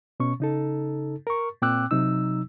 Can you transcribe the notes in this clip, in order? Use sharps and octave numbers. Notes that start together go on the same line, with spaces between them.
B2 C#4 C#6
C#3 D#4 A4
A#4 C#6
A#2 C4 G5 D6 E6 F#6
C3 F#3 D#4 E6